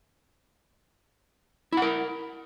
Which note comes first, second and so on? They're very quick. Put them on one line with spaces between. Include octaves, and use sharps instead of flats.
E4 F#5 A#4